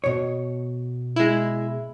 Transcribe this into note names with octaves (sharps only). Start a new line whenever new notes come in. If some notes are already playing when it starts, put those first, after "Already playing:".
B2 C#5
G#3 E4